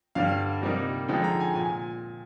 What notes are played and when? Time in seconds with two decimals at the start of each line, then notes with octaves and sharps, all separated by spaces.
0.15 G2 D3 G3 D4 F5
0.62 C3 G3 A#3 D#4
1.08 D3 F3 G#3 D#4 G5
1.24 A#5
1.40 G#5
1.55 A#2 G#5